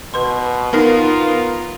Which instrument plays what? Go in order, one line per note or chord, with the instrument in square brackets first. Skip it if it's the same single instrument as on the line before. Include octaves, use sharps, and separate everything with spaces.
[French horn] B2 [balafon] B4 C6
[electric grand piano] B3 A#4 [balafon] D#4 A#5 [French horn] F4